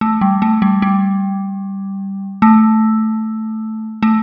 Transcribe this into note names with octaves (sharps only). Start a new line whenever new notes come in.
A3
G3
A3
G3
G3
A3
A3